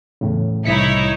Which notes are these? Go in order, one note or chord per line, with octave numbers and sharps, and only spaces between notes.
E2 A2 C#3
C2 D#4 E4 C#5 B6 C#7